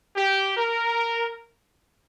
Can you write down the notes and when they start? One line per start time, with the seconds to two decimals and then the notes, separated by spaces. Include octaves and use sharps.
0.16 G4
0.57 A#4